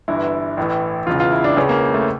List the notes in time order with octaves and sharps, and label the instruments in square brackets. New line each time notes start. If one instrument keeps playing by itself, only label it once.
[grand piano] G1 G2 E3 E4
A1 A2 E3
E1 E2 C#3 F4
F4
E4
D4
C#2 C#3 E3 C#4
A#3
A3